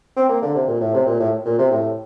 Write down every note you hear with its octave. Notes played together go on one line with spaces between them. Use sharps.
C4
A#3
D3
C3
A#2
A2
C3
A#2
A2
A#2
C3
A2